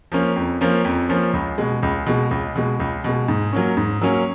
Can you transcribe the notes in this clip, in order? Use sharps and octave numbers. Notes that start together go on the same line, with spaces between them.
F3 A#3 C#4
F2
F3 A#3 C#4
F2
F3 A#3 C#4
C#2
B2 G#3
C#2
B2 G#3
C#2
B2 G#3
C#2
B2 G#3
G#2
F#3 A#3 C#4
G#2
F#3 A#3 C#4